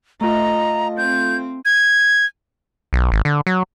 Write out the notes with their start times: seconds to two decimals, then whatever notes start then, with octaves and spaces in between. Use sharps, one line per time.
0.21 A3 F4 D#5 A#5
0.97 C4 G6
1.65 G#6
2.93 B1
3.12 G#1
3.25 D3
3.47 F#3